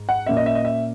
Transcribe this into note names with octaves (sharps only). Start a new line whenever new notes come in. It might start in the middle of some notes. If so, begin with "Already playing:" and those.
Already playing: G#2
F#5
A#2 A#3 C#4 E5
D#5
E5
D#5
E5